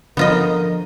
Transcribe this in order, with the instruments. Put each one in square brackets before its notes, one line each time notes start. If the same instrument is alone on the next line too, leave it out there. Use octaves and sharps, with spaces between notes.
[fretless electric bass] D3 [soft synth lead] F3 [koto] B3 F4 D#5 [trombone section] A#4